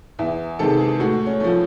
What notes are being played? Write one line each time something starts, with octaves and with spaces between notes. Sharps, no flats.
E2 E5
C3 D#3 G#3 A4
G#4
A2 F#4
C#4
F3 A3